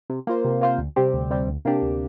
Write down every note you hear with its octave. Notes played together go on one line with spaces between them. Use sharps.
C3
A#3 F4 C5
C3
A#3 F4 C5
D2
C3 G3 C4 G4
D2
C3 G3 C4 G4
D2
C3 A#3 D4 G4
D2